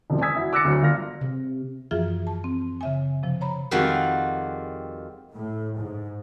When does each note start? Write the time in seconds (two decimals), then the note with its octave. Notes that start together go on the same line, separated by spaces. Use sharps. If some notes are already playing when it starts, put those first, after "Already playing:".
0.10 E1 C#3 F3
0.21 G#5 D#6 E6 G#6 B6
0.36 E4 F#4
0.53 D6 E6 F#6 A6 A#6 C#7
0.65 D2 F#3
0.82 G1 F4 F6 A#6
1.21 C3
1.91 F#2 E3 F3 F4 G#4 E5
2.27 A5
2.44 C4
2.81 C#3 E5 G#5
3.23 C3 F3
3.41 C#5 A#5 B5
3.71 F2 D#3 G3 G#3 F4 F#4
5.35 A2
5.78 G#2